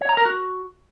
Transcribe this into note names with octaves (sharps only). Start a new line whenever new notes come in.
C#5
A#5
A#4
F#4